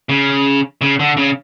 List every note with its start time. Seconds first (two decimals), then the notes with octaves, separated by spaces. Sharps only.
0.09 C#3
0.81 C#3
0.99 D3
1.17 C#3